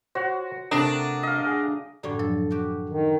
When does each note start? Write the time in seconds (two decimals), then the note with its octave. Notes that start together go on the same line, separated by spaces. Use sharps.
0.15 F#4 C5 C#5 F#5
0.71 C3 A3 D4 G4 A#4 A#5 D#6
1.23 D#5 F5
1.44 G#4 F#5
2.03 F#2 A2 D3 G3 C#5
2.19 F3 F#3 A4
2.51 F#4 G4
2.89 D#3